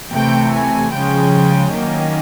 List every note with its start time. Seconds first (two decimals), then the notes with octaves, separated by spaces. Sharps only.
0.13 C3 E3 A3 G5
0.53 G#5
0.93 C#3 F3 G#3 C#4 G5
1.73 D#3 F#3 A#3 C#4